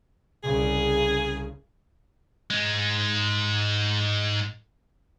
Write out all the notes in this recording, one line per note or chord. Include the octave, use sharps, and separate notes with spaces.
C2 C#3 G#4
G#2 G#3